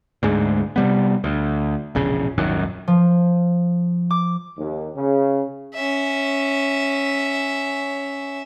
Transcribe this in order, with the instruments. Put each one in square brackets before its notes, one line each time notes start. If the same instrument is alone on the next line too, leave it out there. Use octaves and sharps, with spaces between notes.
[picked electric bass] D2 G#2 G#3
C3 G3 B3
D2
E1 A#1 C#3
D#1 G#1 F#2 D#3
[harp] F3
D6
[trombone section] D#2
C#3
[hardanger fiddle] C#4 E5